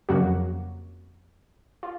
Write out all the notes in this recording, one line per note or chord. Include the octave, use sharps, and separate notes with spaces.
F2 C#3 F#3 A#3 F#4
F4